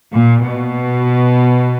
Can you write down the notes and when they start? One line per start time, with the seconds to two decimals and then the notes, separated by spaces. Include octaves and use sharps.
0.13 A#2
0.45 B2